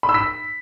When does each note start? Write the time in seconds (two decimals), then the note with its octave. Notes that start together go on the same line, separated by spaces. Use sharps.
0.03 B5
0.09 E6
0.14 B6